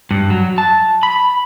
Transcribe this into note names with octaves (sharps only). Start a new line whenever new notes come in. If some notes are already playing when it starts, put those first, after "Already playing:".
G2
F#3
A5
B5